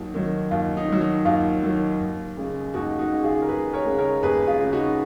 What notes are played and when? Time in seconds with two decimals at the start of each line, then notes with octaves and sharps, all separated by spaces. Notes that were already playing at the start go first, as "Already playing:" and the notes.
Already playing: D#2 D#3 F#3 D#4
0.14 D#3 F#3
0.51 D#2 F4
0.77 D#4
0.89 D#3 F#3
1.01 D#4
1.25 D#2 F4
1.64 D#3 F#3
2.00 D#2
2.37 C#3 G#3
2.74 D#2 D#4 F#4
2.99 D#4 F#4
3.12 C#3 G#3
3.24 F4 G#4
3.42 A#4
3.48 D#2 G#4 B4
3.73 A#4 C#5
3.86 C#3 G#3
3.98 A#4 C#5
4.23 D#2 G#4 B4
4.47 F4 G#4
4.60 C#3 G#3
4.72 D#4 F#4